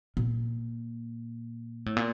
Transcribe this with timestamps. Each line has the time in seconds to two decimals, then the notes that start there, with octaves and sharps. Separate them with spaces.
0.17 A#2
1.86 A2
1.96 A#2